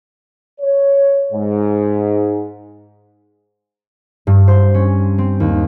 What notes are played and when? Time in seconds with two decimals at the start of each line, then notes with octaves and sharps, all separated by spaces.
0.60 C#5
1.33 G#2
4.27 G2
4.48 C5
4.74 C#4
5.18 C4
5.40 D#2